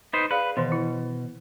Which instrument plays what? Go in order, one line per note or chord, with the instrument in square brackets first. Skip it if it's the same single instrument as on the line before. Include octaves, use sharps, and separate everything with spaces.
[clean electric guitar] D#4 B4 C5
[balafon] G#4 D5 F5 [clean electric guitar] B4
[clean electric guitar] B2 [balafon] D#3 E3
[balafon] E4